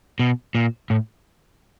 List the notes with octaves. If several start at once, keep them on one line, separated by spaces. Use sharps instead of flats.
B2
A#2
A2